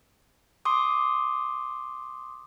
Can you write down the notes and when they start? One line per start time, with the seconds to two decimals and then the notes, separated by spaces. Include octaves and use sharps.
0.65 C6 D6 D#6